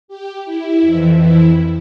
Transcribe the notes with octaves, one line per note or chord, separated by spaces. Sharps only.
G4
E4
F2 E3
E4